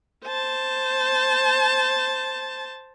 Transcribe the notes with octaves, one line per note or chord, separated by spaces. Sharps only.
C5 A5